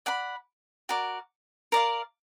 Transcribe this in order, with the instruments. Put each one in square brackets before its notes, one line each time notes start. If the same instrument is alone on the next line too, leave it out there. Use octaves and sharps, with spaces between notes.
[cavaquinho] D5 F#5 B5
F#4 A#4 D5
A#4 D5 F5